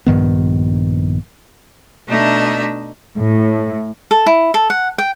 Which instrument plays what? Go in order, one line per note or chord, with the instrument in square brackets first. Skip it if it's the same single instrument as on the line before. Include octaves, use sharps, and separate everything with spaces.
[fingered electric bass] A#1 G2 D#3 B3
[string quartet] B2 A3 D4 D#4 D#5 E5
[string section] A2
[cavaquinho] A4
E4
A4
F#5
G5